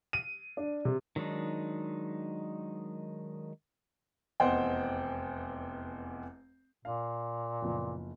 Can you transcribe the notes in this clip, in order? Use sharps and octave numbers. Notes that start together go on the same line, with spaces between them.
D#7
D4
C3
D#3 F#3 G#3 D4 D#4
F1 E2 C5 D#5 F#5 G5
A#2 F5
F#1 F3 B3